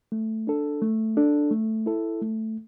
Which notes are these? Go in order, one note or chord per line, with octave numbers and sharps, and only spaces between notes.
A3
D4 A4
A3
D4 A4
A3
E4 A4
A3